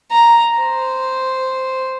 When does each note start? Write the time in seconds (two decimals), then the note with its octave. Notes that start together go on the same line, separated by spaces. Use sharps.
0.12 A#5
0.61 C5